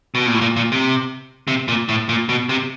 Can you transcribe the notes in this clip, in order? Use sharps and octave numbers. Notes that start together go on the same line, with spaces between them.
B2
A#2
A2
A#2
A#2
C3
C3
A#2
A2
A#2
B2
C3